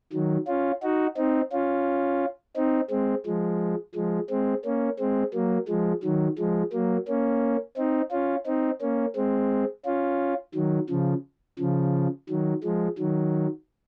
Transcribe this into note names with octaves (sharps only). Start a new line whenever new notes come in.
D#3 F#3
C#4 F4
D#4 F#4
C4 D#4
C#4 F4
C4 D#4
G#3 C4
F3 G#3
F3 G#3
G#3 C4
A#3 C#4
G#3 C4
F#3 A#3
F3 G#3
D#3 F#3
F3 G#3
F#3 A#3
A#3 C#4
C4 D#4
C#4 F4
C4 D#4
A#3 C#4
G#3 C4
C#4 F4
D#3 F#3
C#3 F3
C#3 F3
D#3 F#3
F3 G#3
D#3 F#3